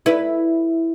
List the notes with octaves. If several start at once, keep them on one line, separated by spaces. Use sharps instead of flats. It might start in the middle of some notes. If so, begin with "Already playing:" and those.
E4 B4